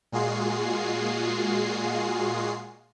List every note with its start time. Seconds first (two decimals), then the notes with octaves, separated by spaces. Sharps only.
0.12 A#2 G#3 F4 F#4 G#4 C7